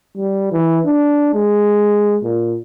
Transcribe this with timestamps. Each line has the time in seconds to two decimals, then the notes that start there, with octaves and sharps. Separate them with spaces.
0.17 G3
0.52 E3
0.86 D4
1.34 G#3
2.23 A#2